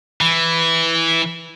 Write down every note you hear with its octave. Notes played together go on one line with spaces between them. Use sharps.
E3